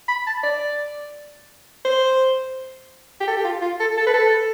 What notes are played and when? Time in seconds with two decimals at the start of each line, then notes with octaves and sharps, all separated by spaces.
0.08 B5
0.27 A5
0.43 D5
1.85 C5
3.20 G4
3.27 A4
3.37 G4
3.44 F4
3.61 F4
3.80 A4
3.97 A4
4.06 B4
4.14 A4